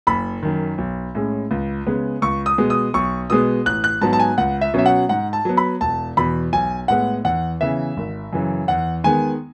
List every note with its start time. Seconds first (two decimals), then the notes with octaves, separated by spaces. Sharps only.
0.07 F#1 B5
0.43 F#2 D#3
0.78 B1
1.15 A2 G#3 C#4
1.51 C#2
1.87 C#3 G#3 B3
2.22 C#2 C#6
2.46 D#6
2.58 B2 G#3 B3
2.70 D#6
2.94 B1 C#6
3.30 B2 G#3 B3 D#6
3.66 A1 F#6
3.84 F#6
4.01 G#2 F#3 B3 A5
4.13 A5
4.20 G#5
4.38 C#2 F#5
4.61 E5
4.74 B2 F#3 C#4 E5
4.86 F#5
5.09 G#2 F#5
5.33 A5
5.45 F#3 B3
5.57 B5
5.81 E1 A5
6.17 E2 B2 B5
6.53 B1 G#5
6.88 A2 G#3 B3 F#5
7.25 E2 F#5
7.61 C#3 E3 B3 E5
7.97 G#1
8.33 F#2 C#3 E3
8.68 E2 F#5
9.04 D#3 G#3 B3 G#5